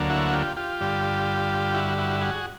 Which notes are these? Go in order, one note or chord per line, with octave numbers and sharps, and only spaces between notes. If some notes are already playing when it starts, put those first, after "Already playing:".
Already playing: D2 D3 F#3 A#3
E4 F#4
F4 G4
F4 G4
G2 D3 G3
E4 F#4
E4 F#4
F#4 G#4